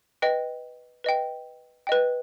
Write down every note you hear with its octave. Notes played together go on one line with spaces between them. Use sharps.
B4 D#5 G5
B4 D#5 G5
B4 D#5 G5